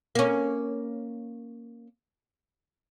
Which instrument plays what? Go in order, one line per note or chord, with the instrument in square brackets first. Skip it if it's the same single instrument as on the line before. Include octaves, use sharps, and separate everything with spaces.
[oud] A#3 C#4